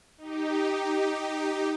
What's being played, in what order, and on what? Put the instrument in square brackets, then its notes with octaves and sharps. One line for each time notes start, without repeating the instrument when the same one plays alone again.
[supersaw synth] D#4 G4